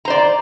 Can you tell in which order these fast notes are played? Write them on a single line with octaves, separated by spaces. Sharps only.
A#5 C5 D5